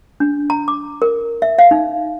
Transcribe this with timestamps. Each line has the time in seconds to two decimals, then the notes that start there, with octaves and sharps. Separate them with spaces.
0.20 D4
0.50 A#5
0.68 D6
1.02 A#4
1.42 E5
1.59 F5
1.71 D#4